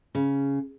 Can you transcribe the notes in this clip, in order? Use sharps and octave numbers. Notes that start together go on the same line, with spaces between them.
C#3